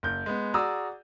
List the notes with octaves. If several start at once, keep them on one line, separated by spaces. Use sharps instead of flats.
F#1 G6
G#3 B3
F#4 G#4 D5 A#5 D#6 E6